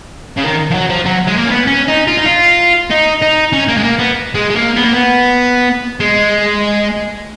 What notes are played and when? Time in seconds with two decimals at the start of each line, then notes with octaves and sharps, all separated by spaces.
0.37 C#3
0.44 D#3
0.71 F3
0.75 F#3
0.90 F3
1.06 F#3
1.27 G#3
1.37 A#3
1.46 C#4
1.51 B3
1.67 C#4
1.88 D#4
2.08 F4
2.17 D#4
2.26 F4
2.90 D#4
3.22 D#4
3.53 C#4
3.68 A#3
3.77 G#3
3.83 A#3
3.99 B3
4.34 G#3
4.50 G#3
4.56 A#3
4.76 B3
4.84 A#3
4.92 B3
6.00 G#3